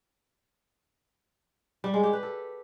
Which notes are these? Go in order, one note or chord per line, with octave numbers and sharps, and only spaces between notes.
G3
G#3
G4
B4
A4